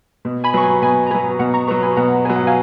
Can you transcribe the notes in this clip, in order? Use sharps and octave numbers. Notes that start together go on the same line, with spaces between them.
B2
G#5 B5
F#3 B3 C#6
G#5 B5
B2 G#5 B5
A#5
F#3 B3 G#5 B5
B2 F#5 A#5
A#5 C#6
F#3 B3 A#5 C#6
G#5 B5
B2 F#5 A#5
F#3 B3 G#5
F#5
F5 G#5